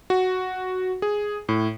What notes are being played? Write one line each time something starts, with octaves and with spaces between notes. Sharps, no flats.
F#4
G#4
A2